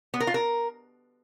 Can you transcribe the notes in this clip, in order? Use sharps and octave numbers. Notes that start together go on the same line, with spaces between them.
B3
A#4
F4
A#4